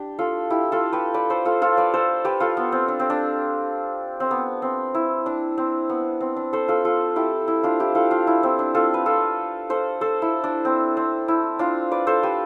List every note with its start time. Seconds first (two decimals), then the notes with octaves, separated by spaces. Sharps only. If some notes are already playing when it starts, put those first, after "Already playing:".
Already playing: D4 G4
0.19 F4 A4
0.50 E4 G4
0.72 F4 A4
0.93 G4 B4
1.14 B4 D5
1.30 A4 C5
1.45 F4 A4
1.62 F4 A4
1.77 B4 D5
1.94 A4 C5
2.25 G4 B4
2.40 F4 A4
2.57 B3
2.72 C4
2.88 D4
3.00 C4
3.10 D4
4.20 C4
4.31 B3
4.62 C4
4.95 E4
5.26 D4
5.58 C4
5.89 B3
6.21 C4
6.36 D4
6.53 A4 C5
6.68 F4 A4
6.85 F4 A4
7.16 E4 G4
7.48 E4
7.63 D4 F4
7.80 E4 G4
7.95 F4 A4
8.11 D4 F4
8.27 E4
8.43 C4
8.59 D4
8.75 F4 A4
8.94 B4
9.06 F4 A4
9.70 A4 C5
10.01 A4 C5
10.22 E4
10.44 D4
10.65 C4
10.97 C4
11.28 E4
11.59 D4 F4
11.91 B4 D5
12.07 A4 C5
12.23 G4 B4